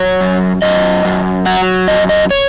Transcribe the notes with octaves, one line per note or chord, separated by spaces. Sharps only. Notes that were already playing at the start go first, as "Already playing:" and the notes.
Already playing: F#3 C#5
F#2
F#2 D#5
F#2
F#3 F#5
F#2 D#5
D#5
C#5